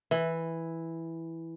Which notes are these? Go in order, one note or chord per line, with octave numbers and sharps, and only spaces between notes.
E3